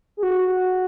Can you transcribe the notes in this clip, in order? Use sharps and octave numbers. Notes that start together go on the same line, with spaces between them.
G#4
F#4